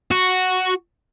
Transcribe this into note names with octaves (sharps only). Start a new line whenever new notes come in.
F#4